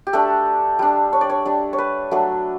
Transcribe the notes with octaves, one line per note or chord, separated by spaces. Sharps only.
G4
A3 D4 A4
G3 D4
C#5
D5
C#5
G3 D4
C#5
B4
F#3 A3 D4